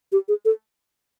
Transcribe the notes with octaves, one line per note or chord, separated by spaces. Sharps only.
G4
G#4
A4